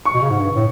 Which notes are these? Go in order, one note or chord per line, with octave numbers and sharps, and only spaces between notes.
C#6
B2
C#3
G#2
G2
A2